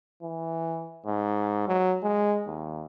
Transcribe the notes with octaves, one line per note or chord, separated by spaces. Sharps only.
E3
G#2
F#3
G#3
D#2